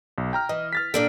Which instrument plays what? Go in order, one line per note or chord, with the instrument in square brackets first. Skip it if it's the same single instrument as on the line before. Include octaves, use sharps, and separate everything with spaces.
[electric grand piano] B1
G5 A#5 F6
[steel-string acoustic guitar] E3 [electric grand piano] D#5
[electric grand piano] F6 A6 B6
[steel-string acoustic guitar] A#2 D4 G5 [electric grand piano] A4